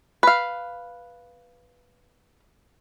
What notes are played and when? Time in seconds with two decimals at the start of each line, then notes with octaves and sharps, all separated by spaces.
0.23 B4 F5